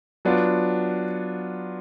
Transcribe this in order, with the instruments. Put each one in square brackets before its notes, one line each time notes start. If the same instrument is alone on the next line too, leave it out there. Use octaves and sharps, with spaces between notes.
[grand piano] F#3 B3 D4 F4